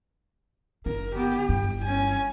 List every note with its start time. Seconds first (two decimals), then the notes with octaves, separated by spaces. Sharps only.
0.86 F#1 D3 A#4
1.15 B3 G4
1.49 G1 G2 G5
1.85 C#4 G#5